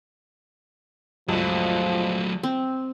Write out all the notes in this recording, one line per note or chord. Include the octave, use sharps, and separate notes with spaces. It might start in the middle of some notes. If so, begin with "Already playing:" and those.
C#2 G2 F3 F#3 A3
C4